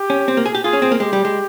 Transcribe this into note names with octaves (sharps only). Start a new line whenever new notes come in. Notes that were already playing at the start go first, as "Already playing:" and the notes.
Already playing: G4
C#4
C4
A#3
G#4
G4
F4 G#4
C#4
C4
A#3
G#3 G4
G3
G#3